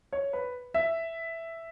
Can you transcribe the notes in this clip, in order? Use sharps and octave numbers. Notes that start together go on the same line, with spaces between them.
C#5
B4
E5